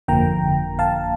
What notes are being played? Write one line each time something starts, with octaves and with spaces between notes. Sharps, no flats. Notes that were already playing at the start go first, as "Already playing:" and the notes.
G1 F2 D3 F3 A#3 G5 A#5
F5 A5